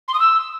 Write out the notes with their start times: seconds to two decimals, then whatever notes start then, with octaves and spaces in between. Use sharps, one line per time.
0.08 C6
0.14 D#6
0.20 E6